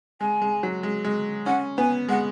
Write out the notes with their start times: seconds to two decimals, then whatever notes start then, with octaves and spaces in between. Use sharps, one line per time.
0.21 G#3 G#5
0.42 G#3
0.63 F#3
0.83 G#3
1.04 G#3
1.46 C#4 F#5
1.78 B3 G#5
2.09 G#3 F#5